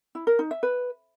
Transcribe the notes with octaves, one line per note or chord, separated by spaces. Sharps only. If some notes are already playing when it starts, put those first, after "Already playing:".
E4
A#4
D#4
E5
B4